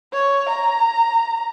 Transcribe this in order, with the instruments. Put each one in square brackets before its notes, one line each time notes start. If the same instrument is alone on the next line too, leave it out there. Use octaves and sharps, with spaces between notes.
[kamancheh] C#5
A#5